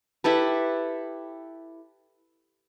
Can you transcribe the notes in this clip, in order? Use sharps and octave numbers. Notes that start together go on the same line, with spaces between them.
E4 G4 A4 B4